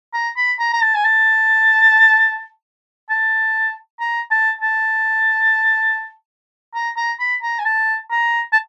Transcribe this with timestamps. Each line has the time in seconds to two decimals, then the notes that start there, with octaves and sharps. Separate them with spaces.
0.14 A#5
0.37 B5
0.59 A#5
0.73 A#5
0.82 A5
0.95 G#5
1.05 A5
3.10 A5
4.00 A#5
4.31 A5
4.61 A5
6.75 A#5
6.97 A#5
7.20 B5
7.42 A#5
7.59 G#5
7.65 A5
8.11 A#5
8.53 A5